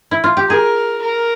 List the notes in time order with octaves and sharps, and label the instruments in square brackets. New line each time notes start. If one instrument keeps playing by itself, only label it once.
[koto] E4
F4
G4
[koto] G#4 [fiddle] A#4
[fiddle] A#4